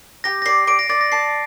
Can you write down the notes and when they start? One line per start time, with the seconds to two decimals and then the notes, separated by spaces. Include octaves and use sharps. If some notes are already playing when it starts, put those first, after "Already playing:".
0.24 G4 A#6
0.42 A#6
0.46 D5 C7
0.67 D5 D7
0.79 A#6
0.89 D5 A6
1.01 A#6
1.12 A5 C7